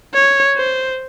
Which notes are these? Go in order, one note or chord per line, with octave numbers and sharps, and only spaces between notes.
C#5
C5